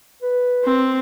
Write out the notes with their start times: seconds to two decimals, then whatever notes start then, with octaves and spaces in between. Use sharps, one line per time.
0.23 B4
0.65 C4